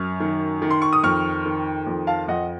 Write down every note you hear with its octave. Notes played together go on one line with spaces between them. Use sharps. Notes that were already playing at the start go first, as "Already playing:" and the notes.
Already playing: F#2 C#6 F6
D#3
D#3
C6
C#6
D#6
F2 C#6 F6
D#3
F2
F5 A5
F2 D#5 F#5